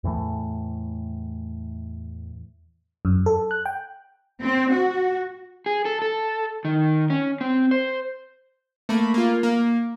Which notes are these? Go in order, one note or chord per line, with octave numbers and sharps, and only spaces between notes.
E2 A2 E3 A3
F#2
A4
F#6
G5
C4
F#4
G#4
A4
A4
D#3
C#4
C4
C5
A3 A#3 B5
A#3 F4
A#3